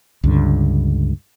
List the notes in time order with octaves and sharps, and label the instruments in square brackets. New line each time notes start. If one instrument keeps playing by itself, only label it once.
[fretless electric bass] C#2 G2 D3